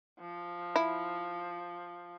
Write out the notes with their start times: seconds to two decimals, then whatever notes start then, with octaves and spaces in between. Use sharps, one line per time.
0.20 F3
0.76 E4